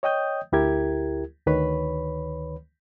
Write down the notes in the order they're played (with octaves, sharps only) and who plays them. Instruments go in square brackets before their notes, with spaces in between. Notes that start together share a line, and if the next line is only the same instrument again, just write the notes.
[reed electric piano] C#5 D#5 G5 D#6 G6
D2 E4 G4 A#4 G#6
D2 D#3 B4 C#5 B5